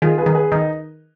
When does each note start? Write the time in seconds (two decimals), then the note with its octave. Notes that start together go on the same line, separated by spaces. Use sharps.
0.02 D#3 F4 G#4
0.18 G#4 B4
0.26 D#3
0.35 G#4 B4
0.51 D#3 D#4